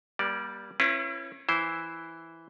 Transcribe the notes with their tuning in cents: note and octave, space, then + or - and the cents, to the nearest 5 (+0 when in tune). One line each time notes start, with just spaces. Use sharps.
G3 +0 A#3 +40 D5 +0
C#4 -30 E4 +35 B4 +0
E3 +0 E4 +0 C5 +0